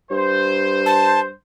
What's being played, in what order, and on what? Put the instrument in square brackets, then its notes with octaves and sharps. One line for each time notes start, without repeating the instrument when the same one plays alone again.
[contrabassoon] G2 [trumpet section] C5
[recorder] A5